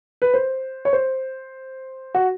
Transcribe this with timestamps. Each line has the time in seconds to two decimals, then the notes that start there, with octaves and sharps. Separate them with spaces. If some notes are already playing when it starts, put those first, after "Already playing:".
0.22 B4
0.34 C5
0.85 C#5
0.93 C5
2.14 F#4